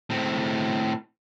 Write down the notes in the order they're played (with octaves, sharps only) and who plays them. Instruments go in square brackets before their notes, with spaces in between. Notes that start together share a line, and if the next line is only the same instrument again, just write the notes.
[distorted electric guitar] A2 C4